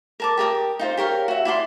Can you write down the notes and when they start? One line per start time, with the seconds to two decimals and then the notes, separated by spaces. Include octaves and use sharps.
0.20 A#4 A5 D6
0.37 G4 A#4 D5 D#6
0.79 D#4 F4 C5
0.97 G4 A#4 C#5 F5
1.28 F#4 E5
1.45 E4 D5 E5 C6